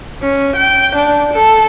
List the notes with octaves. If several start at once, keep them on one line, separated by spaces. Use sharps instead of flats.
C#4
G5
D4
A4